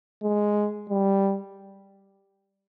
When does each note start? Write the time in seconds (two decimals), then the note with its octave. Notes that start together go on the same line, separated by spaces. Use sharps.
0.23 G#3
0.90 G3